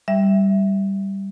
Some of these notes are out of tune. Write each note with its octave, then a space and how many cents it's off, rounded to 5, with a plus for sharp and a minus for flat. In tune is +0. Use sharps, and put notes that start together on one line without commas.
G3 +0 E5 +0